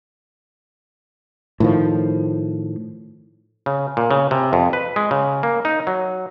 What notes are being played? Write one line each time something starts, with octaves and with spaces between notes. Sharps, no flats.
A2 D#3 F3
C#3
A#2
C#3
C3
F2
B4
G#3
C#3
A#3
D#4
F#3